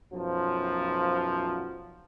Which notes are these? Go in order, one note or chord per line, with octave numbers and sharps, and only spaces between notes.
B1 F#2 F3